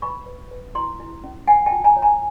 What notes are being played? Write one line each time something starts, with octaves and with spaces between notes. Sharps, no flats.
B4 B5 C#6
B4
B4
E4 A#5 C6
E4
C#4
C#5 F#5 G#5
G5 A5
F4
G#5 A#5
C#5
G#5 A#5